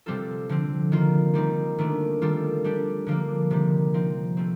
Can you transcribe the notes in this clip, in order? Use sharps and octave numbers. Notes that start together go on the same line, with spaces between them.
C3 G3 C4 F4 A4
D3 F3 C4
D#3 A#3 F4
D#3 G3 C4 D#4
D#3 A3 D4
D#3 G3 D4 F4 A4
G3 D4 G4
D3 F3 A#3 D4 F4
C3 D#3 G3
F3 C4 D#4
F3 A3 C4